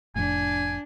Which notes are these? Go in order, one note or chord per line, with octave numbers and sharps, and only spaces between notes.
F1 F2 A2 D4 G#5